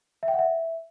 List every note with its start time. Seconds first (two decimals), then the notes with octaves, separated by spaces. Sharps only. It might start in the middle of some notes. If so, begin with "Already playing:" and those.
0.23 E5
0.28 G5
0.33 F#5
0.39 E5